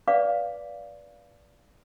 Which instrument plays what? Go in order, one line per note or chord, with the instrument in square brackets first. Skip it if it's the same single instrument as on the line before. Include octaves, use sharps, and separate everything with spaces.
[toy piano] B4 D5 F5 D6